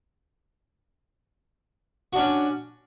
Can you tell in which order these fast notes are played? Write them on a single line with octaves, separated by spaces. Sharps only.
F#4 D4 C#4